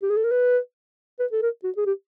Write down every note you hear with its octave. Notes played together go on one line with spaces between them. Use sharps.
G4
G#4
A4
A#4
B4
B4
A4
A#4
F#4
G#4
G4